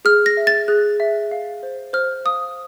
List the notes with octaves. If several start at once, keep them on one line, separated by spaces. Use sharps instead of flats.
G#4 F6
A#6
E5
A6
G#4 F#6
E5
F5
C5
C5 F6
F5 D#6